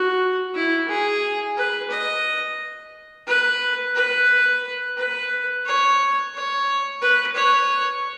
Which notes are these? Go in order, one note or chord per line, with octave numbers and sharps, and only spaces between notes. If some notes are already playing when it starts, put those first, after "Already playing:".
Already playing: F#4
E4
G#4
B4
D#5
B4
B4
B4
C#5
C#5
B4
C#5